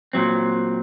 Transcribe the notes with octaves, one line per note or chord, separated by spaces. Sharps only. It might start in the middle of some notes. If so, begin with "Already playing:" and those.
A#2 F#3 C4